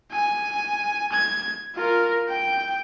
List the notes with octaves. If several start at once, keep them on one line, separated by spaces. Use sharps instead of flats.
G#5
G#6
F4 A#4
G5